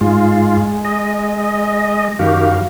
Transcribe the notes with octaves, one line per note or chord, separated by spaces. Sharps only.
G#2 G#3 F4
D#5
F#2 D#3 F#4 G4 F5